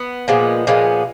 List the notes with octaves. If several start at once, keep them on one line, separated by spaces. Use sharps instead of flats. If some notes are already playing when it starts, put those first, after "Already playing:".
Already playing: B3
A#2 F3 G#3 B3
A#2 F3 G#3 B3